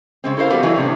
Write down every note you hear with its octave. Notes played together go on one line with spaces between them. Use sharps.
C#3 G#3 C4
E4 A4 A#4 C5 F5
F3 G3 B3 F#4 A4 B4
E3 F#3 D#4
A2 C3 C#4 D4